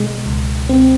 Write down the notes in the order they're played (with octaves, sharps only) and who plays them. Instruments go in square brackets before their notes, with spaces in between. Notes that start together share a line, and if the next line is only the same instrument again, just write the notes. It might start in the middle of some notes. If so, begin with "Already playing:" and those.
Already playing: [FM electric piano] B2 G#3
C#2
C4